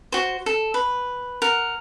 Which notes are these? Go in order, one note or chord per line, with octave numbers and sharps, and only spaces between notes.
F#4 C5
A4
B4
A#4 F#5